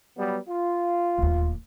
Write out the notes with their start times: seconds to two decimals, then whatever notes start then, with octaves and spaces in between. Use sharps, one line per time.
0.17 F#3 G3 B3
0.48 F4
1.18 D1 D#2